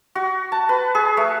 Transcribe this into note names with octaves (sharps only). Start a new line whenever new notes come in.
F#4
A5
B4
G#4
A3